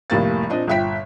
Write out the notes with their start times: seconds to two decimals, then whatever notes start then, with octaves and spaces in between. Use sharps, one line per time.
0.10 F1 A2 G3 A#3 F5 A6
0.49 A#2 C4 D4 D#5
0.67 G1 A#2 E5 G5 B6